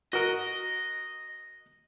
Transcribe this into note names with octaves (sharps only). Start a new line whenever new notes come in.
F#4 A#4 D#5